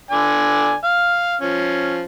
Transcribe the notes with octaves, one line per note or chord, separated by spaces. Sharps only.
D3 D5 G#5
F5
F3 C#4